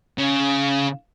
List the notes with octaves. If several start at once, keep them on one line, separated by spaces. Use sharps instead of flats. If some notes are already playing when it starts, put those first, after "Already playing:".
C#3